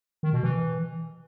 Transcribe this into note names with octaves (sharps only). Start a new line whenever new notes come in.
D#3
B2
E3